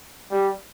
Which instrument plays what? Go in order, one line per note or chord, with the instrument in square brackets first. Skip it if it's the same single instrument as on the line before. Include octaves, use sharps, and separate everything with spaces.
[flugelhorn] G3